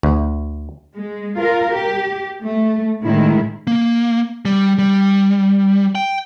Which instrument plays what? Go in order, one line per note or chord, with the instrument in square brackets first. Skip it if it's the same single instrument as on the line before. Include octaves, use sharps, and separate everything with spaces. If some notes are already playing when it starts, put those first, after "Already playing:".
[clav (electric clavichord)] D2
[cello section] G#3
F4 A#4
G4
A3
A2 D#3 G#3 E4
[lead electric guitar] A#3
G3
G3
G5